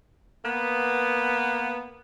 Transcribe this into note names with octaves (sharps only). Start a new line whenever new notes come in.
A#3 B3